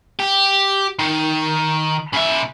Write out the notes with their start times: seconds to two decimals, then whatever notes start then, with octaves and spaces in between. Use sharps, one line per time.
0.19 G4
0.99 D#3
2.13 C#3 E5